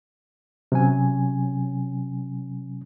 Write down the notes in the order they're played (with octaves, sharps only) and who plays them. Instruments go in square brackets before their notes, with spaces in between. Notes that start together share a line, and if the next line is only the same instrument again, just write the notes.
[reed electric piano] C3 F#3 C#4 G#5